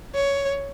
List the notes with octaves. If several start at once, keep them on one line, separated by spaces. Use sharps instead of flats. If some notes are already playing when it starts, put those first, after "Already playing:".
C#5